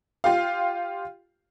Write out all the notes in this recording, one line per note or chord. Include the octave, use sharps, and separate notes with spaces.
F4 G4 F5